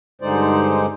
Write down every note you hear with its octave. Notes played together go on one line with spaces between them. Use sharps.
G2 D3 G#3 D#4 C5 D5